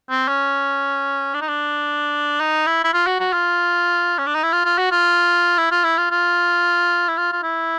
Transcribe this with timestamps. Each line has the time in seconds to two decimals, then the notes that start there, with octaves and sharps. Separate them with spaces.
0.10 C4
0.28 C#4
1.34 D4
1.41 D#4
1.48 D4
2.40 D#4
2.67 E4
2.84 E4
2.93 F4
3.07 F#4
3.20 F#4
3.33 F4
4.18 C#4
4.26 D4
4.35 D#4
4.43 E4
4.52 F4
4.65 F4
4.78 F#4
4.92 F4
5.58 E4
5.72 F4
5.84 E4
5.98 F4
6.11 F4
7.08 E4
7.17 F4
7.32 F4
7.43 E4